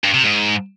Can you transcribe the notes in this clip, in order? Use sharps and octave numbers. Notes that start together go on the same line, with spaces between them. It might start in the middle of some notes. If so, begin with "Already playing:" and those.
G2
C3
G#2